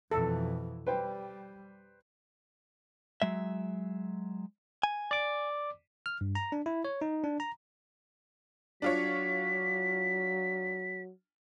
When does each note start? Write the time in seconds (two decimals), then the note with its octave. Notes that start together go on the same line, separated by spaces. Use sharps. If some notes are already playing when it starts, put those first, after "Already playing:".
0.11 F2 B2 E3 A4
0.87 G3 B4 C5 G5
3.22 F#3 G#3 E5
4.83 G#5
5.11 D5 D6
6.06 F6
6.21 G2
6.35 A#5
6.52 D4
6.66 E4
6.85 C#5
7.01 D#4
7.24 D4
7.40 A#5
8.82 F#3 D4 F4 C#5 B6